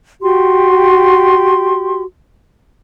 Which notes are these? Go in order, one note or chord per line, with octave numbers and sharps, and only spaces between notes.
F#4 G4 C6